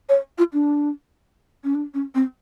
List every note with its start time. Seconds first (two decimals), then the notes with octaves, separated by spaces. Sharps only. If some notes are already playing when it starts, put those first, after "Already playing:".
0.09 C#5
0.38 F4
0.53 D4
1.64 C#4
1.75 D4
1.94 C#4
2.15 C4